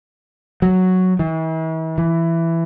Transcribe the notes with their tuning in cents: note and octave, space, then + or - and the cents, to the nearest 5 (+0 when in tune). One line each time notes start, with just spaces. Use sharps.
F#3 +0
E3 -40
E3 +10